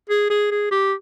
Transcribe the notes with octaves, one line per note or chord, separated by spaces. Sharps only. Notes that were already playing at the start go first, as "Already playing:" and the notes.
G#4
G#4
G#4
G4